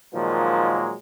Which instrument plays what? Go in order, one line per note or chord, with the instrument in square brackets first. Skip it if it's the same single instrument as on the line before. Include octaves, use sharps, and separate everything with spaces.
[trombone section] A#2 D#3 F3 F#3 G#3